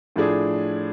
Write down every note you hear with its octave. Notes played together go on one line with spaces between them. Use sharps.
A2 F3 A3 D4 G#4